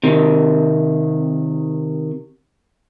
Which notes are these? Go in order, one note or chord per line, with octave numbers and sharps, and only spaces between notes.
C3 D#3